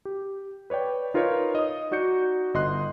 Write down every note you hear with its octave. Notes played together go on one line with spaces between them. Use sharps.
G4
B4 C#5 D5 G5
D#4 F4 A#4 B4 C#5 D#5
D#5 D#6
D#4 F#4 D5 G6 C#7
G1 D#5 C6 F#6